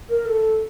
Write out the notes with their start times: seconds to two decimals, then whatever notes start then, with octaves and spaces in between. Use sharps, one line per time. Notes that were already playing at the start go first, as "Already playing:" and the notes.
0.09 A#4
0.26 A4